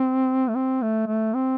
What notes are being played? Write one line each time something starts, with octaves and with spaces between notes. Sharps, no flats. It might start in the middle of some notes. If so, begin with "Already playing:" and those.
Already playing: C4
A3
C4
A3
A3
C4